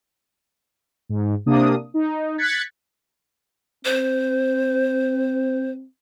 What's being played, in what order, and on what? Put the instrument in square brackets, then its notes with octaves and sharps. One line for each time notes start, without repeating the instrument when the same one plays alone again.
[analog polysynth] G#2
C3 A#3 D4 D#6
D#4
F#6 G#6 A6 B6 C#7
[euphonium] C4 [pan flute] C5